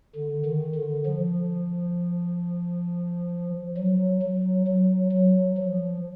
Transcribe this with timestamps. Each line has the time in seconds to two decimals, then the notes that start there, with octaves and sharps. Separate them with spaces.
0.15 D3
0.45 D#3
0.75 D3
1.06 F3
3.77 F#3
4.22 F#3
4.67 F#3
5.11 F#3
5.57 F3